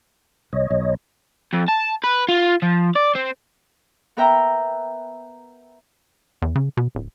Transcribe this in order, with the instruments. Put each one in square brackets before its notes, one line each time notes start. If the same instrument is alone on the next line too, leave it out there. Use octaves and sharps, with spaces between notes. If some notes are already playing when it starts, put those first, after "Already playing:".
[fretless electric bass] C2 [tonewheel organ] C#5 D#5
[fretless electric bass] B1
[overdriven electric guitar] F2
A5
B4
F4
F3
D5
C4
[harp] B3 A#4 E5 G5 A#5
[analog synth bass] E2
C#3
B2
D1